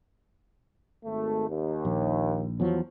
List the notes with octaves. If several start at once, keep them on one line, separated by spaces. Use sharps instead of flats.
G#1 A3
D#2
A#1
E2 F3 F#3